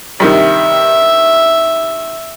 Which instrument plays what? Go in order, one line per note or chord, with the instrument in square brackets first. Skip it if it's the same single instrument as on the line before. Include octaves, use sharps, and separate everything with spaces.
[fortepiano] G2 C3 D#3 [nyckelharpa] E5